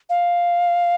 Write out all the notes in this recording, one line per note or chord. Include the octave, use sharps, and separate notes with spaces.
F5